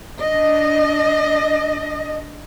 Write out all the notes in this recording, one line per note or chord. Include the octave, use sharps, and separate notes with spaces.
D4 D#5